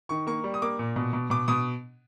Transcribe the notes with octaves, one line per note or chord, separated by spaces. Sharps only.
D#3 C#6
A#3 C#6
G3
D#6
A#3 D6
A#2
B2
B2
B2 D6
B2 D#6